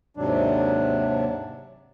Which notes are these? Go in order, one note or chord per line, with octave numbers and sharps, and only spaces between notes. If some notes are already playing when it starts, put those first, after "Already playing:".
D#2 G#2 C3 F#3 D4